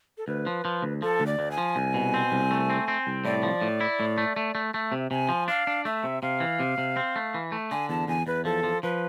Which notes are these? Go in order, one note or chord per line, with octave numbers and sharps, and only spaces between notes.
A4
D2 B4
F3
F3
D2
F3 A4
D2
D5
D2
G#5
F3
C2
B2
C4
C2
A3
C4
C4
C2
A2 D5
F3
A2
E4
A2
A3
A3
A3
A3 E5
C3
C3 G#5
F3
D4 F5
D4
A3 E5
C3
C3 F5
E3
C3
C3
C4
A3
E3
A3
D3 G#5
E2 A5
E2 G#5
E2 B4
F3 A4
F3
F3 B4